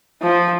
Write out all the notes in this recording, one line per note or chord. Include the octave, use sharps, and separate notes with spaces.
F3